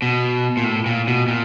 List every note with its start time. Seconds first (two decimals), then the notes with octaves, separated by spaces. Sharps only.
0.02 B2
0.57 A#2
0.64 A2
0.86 A#2
1.07 B2
1.28 A#2